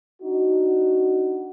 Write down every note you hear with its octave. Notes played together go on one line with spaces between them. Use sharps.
D4 D#4 F#4